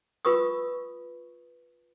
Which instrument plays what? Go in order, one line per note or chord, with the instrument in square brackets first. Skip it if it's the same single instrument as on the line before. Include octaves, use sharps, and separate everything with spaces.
[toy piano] F4 B4 C#6 D#6